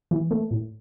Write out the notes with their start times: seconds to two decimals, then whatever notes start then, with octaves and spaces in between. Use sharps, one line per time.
0.11 E3
0.31 A3
0.51 A2